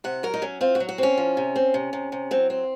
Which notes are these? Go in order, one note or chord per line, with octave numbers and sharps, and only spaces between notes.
C3 F#5
F#3 A#4
D#4
F#3 C#4
C4 F4
F#4
F#3
F#4
C4 C#4
F3
C3
C4
C3
C3
C3
F#3 C4
C4